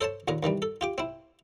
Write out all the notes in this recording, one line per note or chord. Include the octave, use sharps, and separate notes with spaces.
A4 C5 C#5 A5
A#1 D#2 A#2 A#4
C2 D#3 E3 G3
A4
F4 G4 D6
C4 E4